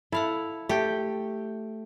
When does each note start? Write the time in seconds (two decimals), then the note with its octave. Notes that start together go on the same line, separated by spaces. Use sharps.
0.12 E4 A4 F5 F#5
0.69 A3 G4 G5